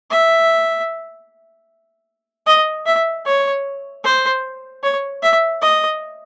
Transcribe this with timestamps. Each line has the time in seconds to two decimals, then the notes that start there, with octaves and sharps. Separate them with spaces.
0.10 E5
2.47 D#5
2.86 E5
3.26 C#5
4.04 C5
4.83 C#5
5.22 E5
5.62 D#5